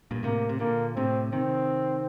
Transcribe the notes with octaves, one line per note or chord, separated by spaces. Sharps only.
G2 A#2
A2 C3 A#3
C3
A#2 D3 A#3
A2 C3 C4
C3 D#3 C4